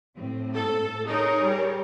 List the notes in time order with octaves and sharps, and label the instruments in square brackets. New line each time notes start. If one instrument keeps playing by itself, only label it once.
[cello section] A2 C4
[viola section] A4
[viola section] D#4 [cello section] G#4 A#4 C#5
[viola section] G3